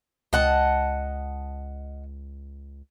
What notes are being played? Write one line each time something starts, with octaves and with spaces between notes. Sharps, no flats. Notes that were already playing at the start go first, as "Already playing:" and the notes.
C#2 D#5 F#5 A5